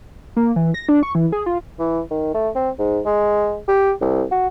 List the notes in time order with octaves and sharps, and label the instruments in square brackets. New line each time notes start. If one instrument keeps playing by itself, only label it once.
[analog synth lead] A#3
E3
A#6
D4
C#6
E3
G#4
F4
[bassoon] E3
D#3
A3
C4
G#2
G#3
G4
C2
F#4